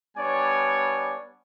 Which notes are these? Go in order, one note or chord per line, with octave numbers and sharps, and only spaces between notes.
G3 B3 D4 C#5 D5 G#5